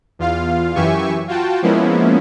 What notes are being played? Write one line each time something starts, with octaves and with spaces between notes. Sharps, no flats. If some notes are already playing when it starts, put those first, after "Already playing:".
E2 F4 F5
F#2 E3 G4 E5 G#5 C#6
F4 F#4 G5 A5
F3 G#3 A#3 B3 C#4 E4